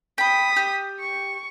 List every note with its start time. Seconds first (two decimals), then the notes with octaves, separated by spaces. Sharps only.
0.18 G5 B5 D#6 B6
0.56 G4
1.00 C#6